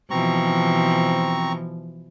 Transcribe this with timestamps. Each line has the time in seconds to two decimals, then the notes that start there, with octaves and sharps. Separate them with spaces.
0.11 B2 E3 F3 C4 A#5 C#6